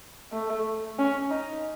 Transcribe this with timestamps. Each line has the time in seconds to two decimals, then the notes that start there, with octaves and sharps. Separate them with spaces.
0.33 A3
0.99 C#4
1.31 D#4